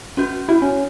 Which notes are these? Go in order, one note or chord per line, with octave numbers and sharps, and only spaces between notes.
C#4 F#4 G6
E4 F#4
C#4